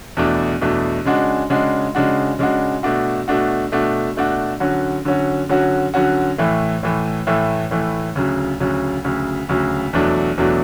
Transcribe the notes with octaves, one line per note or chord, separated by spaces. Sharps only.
E2 B2 A3 D4
E2 B2 A3 D4
C#3 G#3 D4 F#4
C#3 G#3 D4 F#4
C#3 G#3 D4 F#4
C#3 G#3 D4 F#4
B2 A3 D4 F#4
B2 A3 D4 F#4
B2 A3 D4 F#4
B2 A3 D4 F#4
D3 F#3 C#4 F#4
D3 F#3 C#4 F#4
D3 F#3 C#4 F#4
D3 F#3 C#4 F#4
A2 E3 A3
A2 E3 A3
A2 E3 A3
A2 E3 A3
D2 C#3 F#3
D2 C#3 F#3
D2 C#3 F#3
D2 C#3 F#3
E2 B2 F#3 A3 D4
E2 B2 F#3 A3 D4